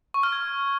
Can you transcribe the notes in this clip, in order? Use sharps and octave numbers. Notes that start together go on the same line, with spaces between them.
C#6
F6
G#6